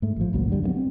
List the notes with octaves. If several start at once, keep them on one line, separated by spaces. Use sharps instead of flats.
G#2 A3
A1 F3
G#1 C#2 A#2 F#3
F#2 D3 F#3 G3
G2 F#3 B3
C4